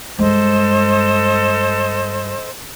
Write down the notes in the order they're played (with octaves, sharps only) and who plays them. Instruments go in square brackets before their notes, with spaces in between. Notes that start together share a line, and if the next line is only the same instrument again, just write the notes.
[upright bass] G2 G#3 [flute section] A4 C5 D#5